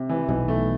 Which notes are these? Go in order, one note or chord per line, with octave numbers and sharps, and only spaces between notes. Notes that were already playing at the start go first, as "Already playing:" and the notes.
Already playing: C3
E3
B1 B2 E3
A3